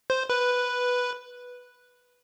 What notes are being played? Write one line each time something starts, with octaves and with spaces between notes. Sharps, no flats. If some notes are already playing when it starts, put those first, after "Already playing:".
C5
B4